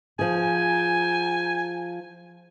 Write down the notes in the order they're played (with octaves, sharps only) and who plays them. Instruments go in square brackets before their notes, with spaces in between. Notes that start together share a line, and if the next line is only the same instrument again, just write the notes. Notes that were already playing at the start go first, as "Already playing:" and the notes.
[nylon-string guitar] F3 G#4 [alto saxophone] G#5